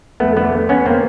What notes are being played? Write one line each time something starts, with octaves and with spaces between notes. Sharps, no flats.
F2 A3 B3
D3 A3 B3
D3
F2 B3 C#4
A#3 C4